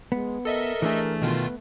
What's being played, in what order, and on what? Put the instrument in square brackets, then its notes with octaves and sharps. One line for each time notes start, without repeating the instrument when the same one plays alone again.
[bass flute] G#3 [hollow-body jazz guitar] B3
[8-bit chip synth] A4 D#5 E5 [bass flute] A#4
[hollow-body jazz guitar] E3 D4 G#4 [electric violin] A3
[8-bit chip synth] B2 D#3 F4 [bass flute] B3